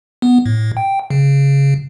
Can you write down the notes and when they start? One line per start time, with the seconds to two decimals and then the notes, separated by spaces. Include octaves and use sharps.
0.22 B3
0.46 A2
0.77 G5
1.10 C#3